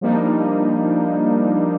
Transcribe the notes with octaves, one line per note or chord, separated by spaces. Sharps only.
F3 G3 A#3 D4 D#4